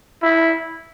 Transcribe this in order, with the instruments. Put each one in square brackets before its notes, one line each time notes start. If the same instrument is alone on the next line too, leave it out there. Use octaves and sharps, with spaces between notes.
[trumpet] E4